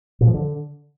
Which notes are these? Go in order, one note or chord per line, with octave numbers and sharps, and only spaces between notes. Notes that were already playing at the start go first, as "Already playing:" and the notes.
A#2
F3
D3